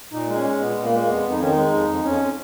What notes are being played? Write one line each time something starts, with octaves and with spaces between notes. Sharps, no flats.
A#2 D#4
G#3 D#4
C#4
G#3
A#2 B3
A#2
A#3
G#3
A#3
F2 B3
F2
D#4
D#3 C#4
D#4
G#3
F2
F2
F2 C#4